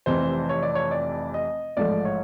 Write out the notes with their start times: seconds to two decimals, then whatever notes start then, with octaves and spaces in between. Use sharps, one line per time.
0.06 F1 F2 C3 E3 C5
0.49 C#5
0.63 D5
0.75 C#5
0.91 D5
1.34 D#5
1.77 A1 G#2 F3 A3 D5
2.05 C#5